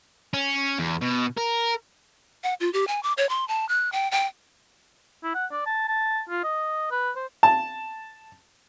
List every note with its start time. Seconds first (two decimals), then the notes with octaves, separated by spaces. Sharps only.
0.34 C#4
0.79 E2
1.02 B2
1.37 A#4
2.44 F#5
2.60 F4
2.73 G4
2.87 G#5
3.03 D6
3.17 C#5
3.29 C6
3.48 A5
3.69 F#6
3.92 G5
4.11 G5
5.24 E4
5.35 F#5
5.52 D5
5.66 A5
5.88 A5
6.29 F4
6.44 D#5
6.91 B4
7.16 C5
7.43 A5